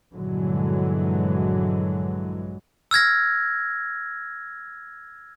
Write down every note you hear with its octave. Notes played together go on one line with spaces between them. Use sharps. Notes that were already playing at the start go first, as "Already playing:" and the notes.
A#1 G2 D3 E3 F#3 G#3
E6 F6 G#6 A#6